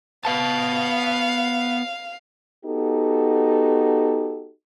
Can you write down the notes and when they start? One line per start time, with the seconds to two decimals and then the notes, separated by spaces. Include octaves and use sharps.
0.25 B3 B4 F5 A5
2.64 B3 D#4 F#4 G4 A4